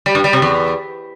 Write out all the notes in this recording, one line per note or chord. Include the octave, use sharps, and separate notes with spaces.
G3
G2
G3
C3
E2